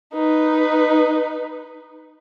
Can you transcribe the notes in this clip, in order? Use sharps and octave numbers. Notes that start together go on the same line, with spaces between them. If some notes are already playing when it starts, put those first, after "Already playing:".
D#4 B4